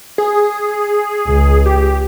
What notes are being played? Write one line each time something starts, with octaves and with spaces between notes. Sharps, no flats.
G#4
C#2
G4